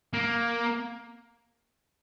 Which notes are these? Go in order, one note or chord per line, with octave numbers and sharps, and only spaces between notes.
A#3